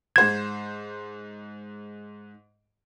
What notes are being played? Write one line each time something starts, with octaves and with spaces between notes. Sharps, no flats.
G#2 C5 G#6 E7